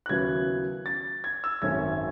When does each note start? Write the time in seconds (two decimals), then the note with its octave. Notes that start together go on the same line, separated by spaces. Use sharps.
0.06 F#6
0.09 D#2 C#3 F#3 B3 E4 G#6
0.86 A6
1.24 G#6
1.44 E6
1.62 G#1 F#2 D#3 A3 C#4 G#6